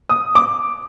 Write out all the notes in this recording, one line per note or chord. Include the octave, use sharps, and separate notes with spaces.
D#6
D6